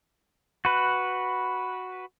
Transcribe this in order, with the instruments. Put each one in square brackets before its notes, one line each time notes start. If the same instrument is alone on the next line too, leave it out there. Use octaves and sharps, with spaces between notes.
[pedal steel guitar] F#4 B4